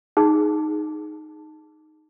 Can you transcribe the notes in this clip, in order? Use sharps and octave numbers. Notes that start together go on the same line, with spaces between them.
D#4 G#4